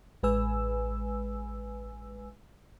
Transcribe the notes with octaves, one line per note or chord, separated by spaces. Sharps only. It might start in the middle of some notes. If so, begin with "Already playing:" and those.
A1 G#3 B4 G#5 E6